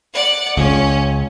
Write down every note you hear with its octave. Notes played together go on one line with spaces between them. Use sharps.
D5 F#5
C#2 C#4